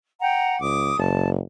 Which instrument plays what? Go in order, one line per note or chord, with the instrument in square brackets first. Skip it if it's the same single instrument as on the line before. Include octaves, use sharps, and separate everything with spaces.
[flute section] F#5 G5 A#5
[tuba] C#2 [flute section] D6 D#6
[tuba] F#1 [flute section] A5